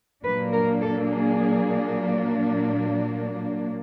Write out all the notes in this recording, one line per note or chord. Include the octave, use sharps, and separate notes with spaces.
A#2 F#3 A#3 D4 B4
A#4
A4
G#4